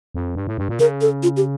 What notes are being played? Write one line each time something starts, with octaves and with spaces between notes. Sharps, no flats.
F2
G2
A2
G2
A#2
C#3 A#4
A4
F4
G4